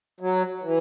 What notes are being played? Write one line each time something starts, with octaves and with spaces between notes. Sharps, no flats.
F#3
E3